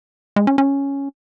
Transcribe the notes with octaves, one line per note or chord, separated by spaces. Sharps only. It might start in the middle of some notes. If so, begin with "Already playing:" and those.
G#3
C#4
C#4